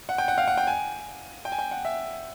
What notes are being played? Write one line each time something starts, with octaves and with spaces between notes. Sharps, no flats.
F#5
G5
F#5
F5
F#5
G5
G#5
G5
G#5
G5
F#5
E5